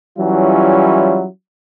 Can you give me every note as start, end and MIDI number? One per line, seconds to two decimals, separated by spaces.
0.18 1.24 52
0.18 1.24 54
0.18 1.24 55
0.18 1.24 61
0.18 1.24 64
0.18 1.24 65